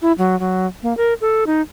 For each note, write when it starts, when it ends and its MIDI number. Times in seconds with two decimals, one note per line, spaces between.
0.02 0.12 64
0.18 0.38 54
0.40 0.66 54
0.83 0.95 58
0.97 1.14 70
1.21 1.44 69
1.47 1.62 63